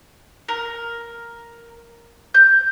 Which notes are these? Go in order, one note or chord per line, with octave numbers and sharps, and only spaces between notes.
A#4
G6